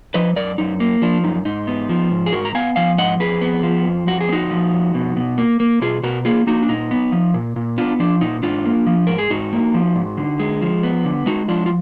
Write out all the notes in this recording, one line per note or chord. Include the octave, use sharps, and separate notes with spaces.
F3 B4 D#5
F#2 A#4 D5
F#2 D#4
A#3
F3 D4
F#2 D#4
G#2 D#4
B3
F3
G#2
G#4
G#2 F#4 A#4
A#5
B3 F5 G#5
F3 F5 G#5
G#2 D#5 F#5
F2 G#4 B4
B3
F3
F2
F2 F#4
G#4
B3
D#4 F#4
F3
F2
B2
B2
A#3
A#3
B2 F4 G#4
B2 F#4 A#4
A#3 F4 G#4
A#3 D#4 F#4
D4
A#2 D#4
B3
F3
A#2
A#2
B3 D4 F4
F3 D4
A#2 D#4
G#2 D4 F4
A#3
F3
G#2 A#4
G#4
G#2 D#4 F#4
A#3
F3
G#2
D3
G#3
F3
B3
D3
G#3 D#4 F#4
F3 D4 F4
F4